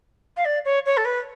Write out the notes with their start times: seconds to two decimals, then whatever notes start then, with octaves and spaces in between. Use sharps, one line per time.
0.37 F5
0.45 D5
0.65 C#5
0.86 C#5
0.97 A4
1.05 B4